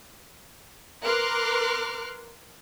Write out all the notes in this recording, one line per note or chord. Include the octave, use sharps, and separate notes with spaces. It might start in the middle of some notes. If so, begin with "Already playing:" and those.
A#4 B4 C6 D6 F6 F#6